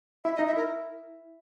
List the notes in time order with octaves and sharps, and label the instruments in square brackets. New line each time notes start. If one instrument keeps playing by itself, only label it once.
[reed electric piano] E4 [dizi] E5
[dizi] D#5
[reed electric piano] D#4
[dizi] E5
[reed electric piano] E4 [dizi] A#4